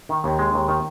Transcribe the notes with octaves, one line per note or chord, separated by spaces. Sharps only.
D#3
D#2
G#3
D#2
D#3